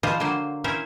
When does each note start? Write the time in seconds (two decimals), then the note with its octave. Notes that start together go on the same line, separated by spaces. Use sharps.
0.03 F3 G3 G#3 F4 C5 D#5
0.20 D3 F#3 A#3 C5
0.64 C#4 E4 A#4 C5 C#5